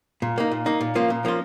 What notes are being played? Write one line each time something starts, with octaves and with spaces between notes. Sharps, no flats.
A#2
A#3 D#4
A#2
A#3 D#4
A#2
F3 A#3 C#4 F4
A#2
F3 A#3 C#4 F4